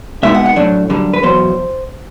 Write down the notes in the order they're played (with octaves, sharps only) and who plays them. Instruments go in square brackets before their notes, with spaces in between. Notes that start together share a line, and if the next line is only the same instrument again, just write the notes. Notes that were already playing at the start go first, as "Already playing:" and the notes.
[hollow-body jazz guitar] B2 G#3 B3 D#4 E5
F#5
F#5
A2 F#3 A3 D4
F#2 D3 G3
B4
E2 B2 F#3 C5